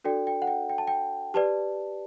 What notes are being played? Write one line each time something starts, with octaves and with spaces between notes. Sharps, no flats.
D4 F#4 A4 D5 G5
G5
F#5
G5
G5
A5
G5
G4 B4 D5 A5